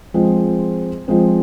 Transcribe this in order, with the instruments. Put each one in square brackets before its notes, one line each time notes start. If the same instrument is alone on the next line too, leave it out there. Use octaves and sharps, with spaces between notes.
[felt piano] F3 G#3 C4
F3 G#3 C4